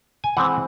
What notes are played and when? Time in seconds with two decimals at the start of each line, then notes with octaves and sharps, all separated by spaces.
0.24 G#5
0.37 E3 G#3 C4 F#5